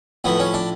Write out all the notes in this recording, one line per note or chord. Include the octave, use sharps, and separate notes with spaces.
A2 F3 B3
C#4
D4